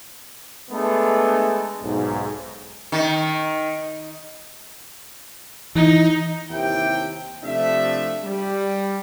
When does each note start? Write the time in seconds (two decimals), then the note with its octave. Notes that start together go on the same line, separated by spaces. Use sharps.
0.71 G#3 A3 B3 D4
1.83 B1 G#2
2.92 D#3
5.75 E3 D#4
6.50 D#2 C3 E4 G4 G5
7.44 C3 F3 A3 D4 E5
8.25 G3